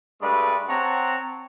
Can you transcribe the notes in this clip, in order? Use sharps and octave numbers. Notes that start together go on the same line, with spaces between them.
G2 G#3 A3 B4 D5
C4 C#5 F#5 A5 A#5